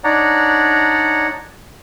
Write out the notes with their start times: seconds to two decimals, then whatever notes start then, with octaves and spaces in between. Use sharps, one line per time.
0.04 D4 D#4 C#5 D5 F#5 A#5